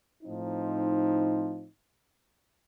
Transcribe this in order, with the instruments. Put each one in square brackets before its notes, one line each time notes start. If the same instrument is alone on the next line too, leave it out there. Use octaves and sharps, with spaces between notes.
[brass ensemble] A2 F3 C4 D#4